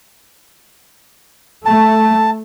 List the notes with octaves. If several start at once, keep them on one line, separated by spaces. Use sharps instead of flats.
A3 A5